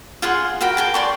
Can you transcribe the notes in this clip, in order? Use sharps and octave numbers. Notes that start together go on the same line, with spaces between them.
F4 G#4 F#5 C6
F#4 A#4 G5 B5
G#4 G5 A5
D5 C6 C#6